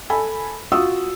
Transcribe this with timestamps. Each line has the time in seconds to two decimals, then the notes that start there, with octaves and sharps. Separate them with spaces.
0.10 A4 G#5 B5
0.72 F4 F#4 D#6 E6